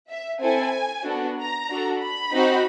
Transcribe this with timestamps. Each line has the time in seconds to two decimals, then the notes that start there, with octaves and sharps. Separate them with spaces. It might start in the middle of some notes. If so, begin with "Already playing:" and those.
0.09 E5
0.41 C4 E4 A4 G#5
1.05 B3 D4 F#4 A4
1.37 A#5
1.69 D4 F#4 A4
2.01 B5
2.33 C4 D#4 F#4